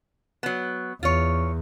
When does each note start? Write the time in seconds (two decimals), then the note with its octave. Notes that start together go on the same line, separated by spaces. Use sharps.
0.43 F#3 B3
1.03 E2 F4 C#5